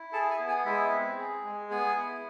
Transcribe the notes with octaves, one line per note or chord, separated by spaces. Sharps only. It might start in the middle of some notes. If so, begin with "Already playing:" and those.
Already playing: E4
G#4 A4 A5
G#4 G#5
B3
G#4 G#5
G#3 E4 E5
C4
G#4
G#3
B3 G#4 G#5
E4